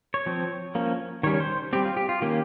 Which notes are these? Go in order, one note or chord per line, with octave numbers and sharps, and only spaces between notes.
C#5
F3 C4
F3 A#3 C#4
D#3 G3 C#4 C#5
C5
G3 C4 G4
F4
G4
F4
D#3 A#3 C#4 G4